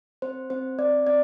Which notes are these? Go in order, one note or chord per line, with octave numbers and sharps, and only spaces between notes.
C4 C5
C4 C5
C4 D5
C4 D5